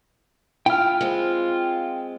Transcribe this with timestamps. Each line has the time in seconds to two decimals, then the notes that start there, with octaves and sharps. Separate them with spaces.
0.66 E4 F4 G5 F6
1.01 G#3 C4